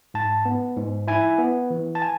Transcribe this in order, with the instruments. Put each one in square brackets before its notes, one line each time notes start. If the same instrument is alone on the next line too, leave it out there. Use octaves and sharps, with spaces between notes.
[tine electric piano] G#2 A5
B3
G#2
E4 G#5
B3
E3
A5
G#5